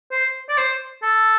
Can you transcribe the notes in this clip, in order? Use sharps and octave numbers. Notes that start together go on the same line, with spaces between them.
C5
D5
C5
A4